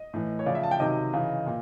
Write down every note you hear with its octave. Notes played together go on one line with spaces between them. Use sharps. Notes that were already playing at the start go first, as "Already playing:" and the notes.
Already playing: D#5
A2 E3
C#5
C#3 F3 D5
E5
A5
G5
C3 D#3 F#3 D#5
C#3 E3
A#2